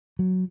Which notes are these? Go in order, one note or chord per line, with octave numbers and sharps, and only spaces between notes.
F#3